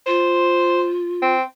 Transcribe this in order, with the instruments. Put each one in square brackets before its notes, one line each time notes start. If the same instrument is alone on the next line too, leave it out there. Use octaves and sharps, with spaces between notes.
[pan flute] F4 [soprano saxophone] C5
[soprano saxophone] C4